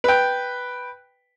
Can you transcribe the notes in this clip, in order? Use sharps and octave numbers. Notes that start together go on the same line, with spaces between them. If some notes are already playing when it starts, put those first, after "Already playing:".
B4 G5